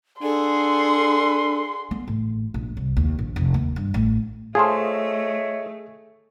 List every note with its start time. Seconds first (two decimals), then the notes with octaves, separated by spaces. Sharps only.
0.22 D4 G#4 A4 F#5 C6
1.91 B3
2.08 A1
2.54 A#1
2.77 C2
2.97 D#2
3.19 A#1
3.36 F1
3.54 D#2
3.76 G2
3.94 A1
4.55 A3 F4 G#4 A4 C5 C#5 D#5 E5